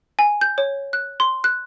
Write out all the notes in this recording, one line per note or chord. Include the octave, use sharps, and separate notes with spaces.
G#5
G6
C#5
F#6
C6
F#6